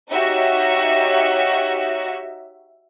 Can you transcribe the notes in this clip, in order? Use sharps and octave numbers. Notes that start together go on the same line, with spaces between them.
D#4 F#4 G4 C#5 E5 C#6